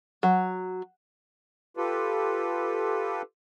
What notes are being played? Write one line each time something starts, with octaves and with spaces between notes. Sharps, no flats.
F#3
F4 G4 A4 B4